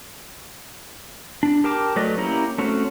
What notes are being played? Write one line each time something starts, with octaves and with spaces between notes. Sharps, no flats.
D4
G4 A#4 G5 A5 D6
F#3 A3 B4 D5 D#5
A#3 C#4 E4 G4 A#5
A3 C4 C#4 F#4